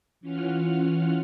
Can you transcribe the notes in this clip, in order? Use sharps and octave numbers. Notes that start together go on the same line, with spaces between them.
E3 C#4 F4 F#5 F6